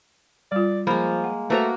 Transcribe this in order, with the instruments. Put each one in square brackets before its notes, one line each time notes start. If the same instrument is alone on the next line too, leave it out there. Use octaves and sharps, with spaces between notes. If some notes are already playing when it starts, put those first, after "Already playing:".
[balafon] G3 F4 [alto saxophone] D5
[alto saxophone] F3 [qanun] G#3 A#3 [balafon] B5
[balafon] F#5
[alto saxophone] A3 [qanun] A#3 F#4 A#5 [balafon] B4 C5